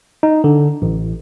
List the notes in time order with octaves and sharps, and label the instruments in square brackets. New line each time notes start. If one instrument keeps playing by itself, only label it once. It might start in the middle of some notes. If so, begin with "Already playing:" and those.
[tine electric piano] D#4
D3
A1